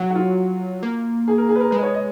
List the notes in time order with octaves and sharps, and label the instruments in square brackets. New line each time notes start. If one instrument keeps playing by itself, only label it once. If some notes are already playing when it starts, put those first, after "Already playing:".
Already playing: [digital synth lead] F#3 [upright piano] F#4
[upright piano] F#4
F4
[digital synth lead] A#3
[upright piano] G#4
A#4
G#4
B4
A#4
[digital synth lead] G#3 [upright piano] B4
[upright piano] D#5
C#5
D#5